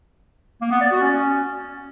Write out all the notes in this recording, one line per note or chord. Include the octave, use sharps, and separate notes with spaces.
A#3
B3
D5
F#4
C#4